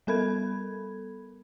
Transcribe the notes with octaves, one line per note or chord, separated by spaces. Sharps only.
G3 B3 A4 A#4 B5 G#6